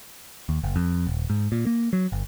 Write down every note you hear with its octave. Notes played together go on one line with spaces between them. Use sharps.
D#2
F#1
F2
D#1
G#2
A#2
A#3
F#3
G1